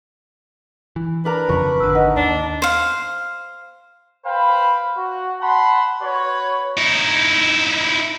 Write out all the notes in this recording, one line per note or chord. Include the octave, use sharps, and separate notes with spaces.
E3
D4 A#4 B4 A#5
F2 C#3 F3 A#5 C#6
G#1 D3 E6
D#4 F#5
D#2 D4
C5 F5
B4 C5 F5 G5 B5
F#4
F#5 A5 B5 C6
F#4 B4 C#5
D#4 E4